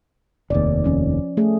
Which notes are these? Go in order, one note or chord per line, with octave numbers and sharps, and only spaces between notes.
F1 D#2 D5
F3 C#4
A3 G#4